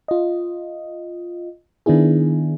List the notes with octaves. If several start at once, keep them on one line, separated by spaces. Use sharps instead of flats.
F4 D#5
D#3 B3 D4 E4 G#4